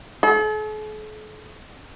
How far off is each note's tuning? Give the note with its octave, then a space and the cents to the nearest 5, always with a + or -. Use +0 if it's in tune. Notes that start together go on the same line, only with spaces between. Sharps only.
A4 -45